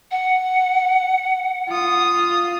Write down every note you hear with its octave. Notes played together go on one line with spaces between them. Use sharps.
F#5
F4 D#6